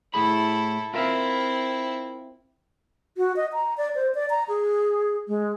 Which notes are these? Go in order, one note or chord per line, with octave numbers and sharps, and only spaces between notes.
A2 E4 G#4 A4 B5
C4 E4 F4 A#4 E5
F#4
D#5
A#5
D5
C5
D5
A#5
G#4
G#3